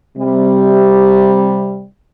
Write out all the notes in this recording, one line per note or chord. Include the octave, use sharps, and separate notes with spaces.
C3 G3